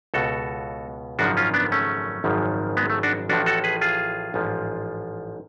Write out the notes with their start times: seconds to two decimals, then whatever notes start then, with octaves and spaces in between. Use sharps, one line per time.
0.14 C#2 B2 F#4 A4
1.19 G#1 F#2 C#3 F3 D4 F#4
1.37 C#4 F4
1.54 B3 D4
1.72 A3 C#4
2.24 G#1 F#2 C#3 F3
2.77 G#3 B3
2.90 A3
3.03 D4 F#4
3.29 A1 A2 F3 D4 F#4
3.46 F#4 A4
3.64 G#4 B4
3.81 F4 G#4
4.34 A1 G#2 F3